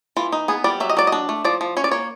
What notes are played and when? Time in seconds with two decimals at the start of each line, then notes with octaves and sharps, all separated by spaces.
0.16 E3 F4
0.32 D#4
0.48 B3 G#4
0.64 G3 D5
0.80 F#3 E5
0.89 D#5
0.97 F#3 D5
1.07 D#5
1.12 D4
1.29 A3
1.44 F3 D5
1.61 F3
1.77 C#4 C#5
1.84 D5
1.91 A#3 C#5